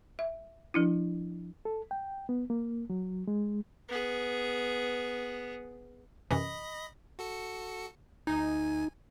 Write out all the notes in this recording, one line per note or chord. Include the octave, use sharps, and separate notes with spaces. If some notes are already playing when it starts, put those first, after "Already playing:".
E5
F3 D4 E4
A4
G5
B3
A#3
F#3
G#3
B3 G#4
F#2 C3 E3 D#5 B5 A#6
F#4 A4 C#7
D2 D#4 G#5